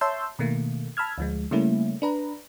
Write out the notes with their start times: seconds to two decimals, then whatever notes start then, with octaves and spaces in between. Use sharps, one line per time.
0.01 C#5 E5 A5 C6 E6 G6
0.39 B2 D#3 A3 A#3
0.97 A5 B5 E6 F6 G#6
1.18 D2 F3 G#3
1.51 C#3 G3 A3 A#3 C#4 E4
2.02 D4 B4 A#5